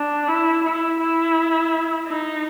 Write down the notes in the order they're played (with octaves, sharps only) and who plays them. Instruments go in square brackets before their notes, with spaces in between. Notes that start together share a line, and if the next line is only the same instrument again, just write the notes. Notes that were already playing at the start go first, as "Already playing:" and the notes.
Already playing: [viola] D4
E4
E4
E4
D#4